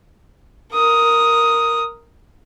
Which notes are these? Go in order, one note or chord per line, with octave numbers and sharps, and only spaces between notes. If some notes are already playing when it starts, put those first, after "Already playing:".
A#4 D#6